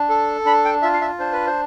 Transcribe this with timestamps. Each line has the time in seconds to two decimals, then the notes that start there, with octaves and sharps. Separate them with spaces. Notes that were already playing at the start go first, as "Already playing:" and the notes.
Already playing: D4
0.09 A4
0.45 D4 B5
0.65 G5
0.82 F4 E5
0.94 F5
1.01 E5
1.19 D4 C5
1.32 B4
1.47 C5